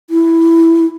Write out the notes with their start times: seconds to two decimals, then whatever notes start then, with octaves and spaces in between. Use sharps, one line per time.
0.10 E4